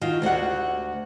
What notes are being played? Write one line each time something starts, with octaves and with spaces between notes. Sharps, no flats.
D#3 F4 F#4
D2 F#4 G4 F#5